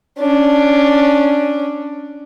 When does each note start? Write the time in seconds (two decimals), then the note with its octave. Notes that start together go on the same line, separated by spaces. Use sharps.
0.19 C#4 D4